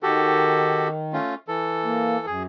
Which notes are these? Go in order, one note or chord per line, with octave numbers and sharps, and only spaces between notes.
D#3 F#4 G4 A4
A3 C#4 F4
E3 A4
A#3
F#2 G#4